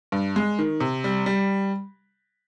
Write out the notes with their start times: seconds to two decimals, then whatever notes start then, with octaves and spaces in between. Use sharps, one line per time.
0.12 G2
0.36 G#3
0.59 D#3
0.80 C3
1.04 G3
1.26 G3